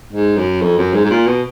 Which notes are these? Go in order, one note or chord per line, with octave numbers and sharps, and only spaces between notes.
G#2
F#2
F2
F#2
G#2
G#2
A#2
B2